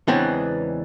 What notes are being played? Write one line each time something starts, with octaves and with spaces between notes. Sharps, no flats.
E2 C#3 E3 G#3 B3 C4 D4